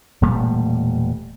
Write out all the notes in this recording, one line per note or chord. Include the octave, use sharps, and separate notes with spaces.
E1 A#2 G3 A3